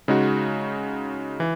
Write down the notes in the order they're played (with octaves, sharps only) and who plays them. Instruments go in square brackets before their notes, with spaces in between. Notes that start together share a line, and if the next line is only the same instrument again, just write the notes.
[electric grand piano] C#3 G#3 D#4 F#4
E3